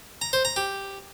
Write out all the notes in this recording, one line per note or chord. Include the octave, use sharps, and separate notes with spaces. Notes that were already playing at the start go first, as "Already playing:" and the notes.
A#5
C5
A#5
G4